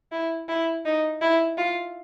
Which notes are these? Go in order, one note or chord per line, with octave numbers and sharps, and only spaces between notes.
E4
E4
D#4
E4
F4